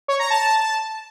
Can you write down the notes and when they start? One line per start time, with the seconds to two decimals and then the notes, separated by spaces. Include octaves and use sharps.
0.08 C#5
0.19 A#5
0.30 A5